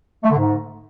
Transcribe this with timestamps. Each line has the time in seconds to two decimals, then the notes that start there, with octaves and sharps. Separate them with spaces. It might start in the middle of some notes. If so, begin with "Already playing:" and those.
0.24 A3
0.30 D3
0.36 G#2